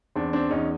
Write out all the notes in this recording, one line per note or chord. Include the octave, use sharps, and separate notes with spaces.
E2 C4 D4
C4 D4
E2 C#4 D#4